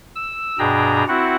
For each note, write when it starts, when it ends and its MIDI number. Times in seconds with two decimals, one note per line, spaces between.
0.16 0.58 88
0.59 1.04 43
0.59 1.04 47
0.59 1.04 62
0.59 1.04 68
0.59 1.04 79
0.59 1.04 82
1.08 1.36 60
1.08 1.36 64
1.08 1.36 66
1.08 1.36 78